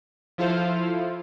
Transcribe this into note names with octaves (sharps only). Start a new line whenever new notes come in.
F3 E4 F4 A4 C5 F5